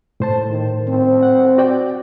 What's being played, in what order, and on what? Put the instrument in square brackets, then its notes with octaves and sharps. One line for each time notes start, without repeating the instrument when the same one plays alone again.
[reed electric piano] A2 C5 A5
[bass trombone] D#3
C4
[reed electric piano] F#5
F#4 D5 G5